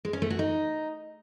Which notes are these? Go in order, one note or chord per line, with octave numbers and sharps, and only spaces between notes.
G#3
C#4
A3
F#4
D#4